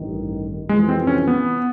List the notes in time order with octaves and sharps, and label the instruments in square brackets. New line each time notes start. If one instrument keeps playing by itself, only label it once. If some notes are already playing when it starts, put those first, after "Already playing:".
Already playing: [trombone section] A1 G2 D#3
[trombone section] F2 C3 E3 [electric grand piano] G#3
[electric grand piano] C4
C#4
B3